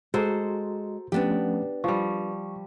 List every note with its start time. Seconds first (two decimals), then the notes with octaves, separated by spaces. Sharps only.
0.14 G#3 F#4 A4 C5 A#5
1.12 F3 A3 B3 C#4 D4 G4
1.84 F3 G3 C#6